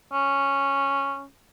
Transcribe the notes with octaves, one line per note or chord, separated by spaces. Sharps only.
C#4